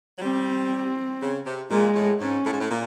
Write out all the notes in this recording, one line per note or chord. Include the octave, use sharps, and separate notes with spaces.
F#3
G3 C4
C#3
C3
A#2 G#3
A2
G#2 C#4
A2
G#2
A2
A#2